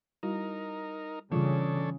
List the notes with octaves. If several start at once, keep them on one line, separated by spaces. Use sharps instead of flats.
G3 D#4 E4 F#4 A#4
C#3 E3 G3 C#4 D4 F4 A4 C#5